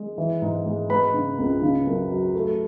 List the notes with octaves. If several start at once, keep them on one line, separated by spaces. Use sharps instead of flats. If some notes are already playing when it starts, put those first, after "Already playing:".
Already playing: G#3
E3
G#2
G#3
G#3 B4 B5
C#3
C#2
C#3
F#2
F#3
A3